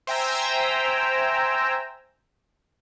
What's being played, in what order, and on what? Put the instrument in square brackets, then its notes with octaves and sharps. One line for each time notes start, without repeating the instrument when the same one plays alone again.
[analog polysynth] C5 E5 G5 G#5 A#5 E6